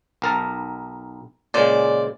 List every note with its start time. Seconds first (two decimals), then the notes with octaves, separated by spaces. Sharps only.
0.22 B1 A#4 A5
1.54 A#2 C#3 G#3 C5 D5